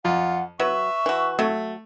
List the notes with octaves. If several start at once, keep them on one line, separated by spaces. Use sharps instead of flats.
F2 F4 F#5
F#3 B4 E5 C#6
E3 F#4
F#3 A3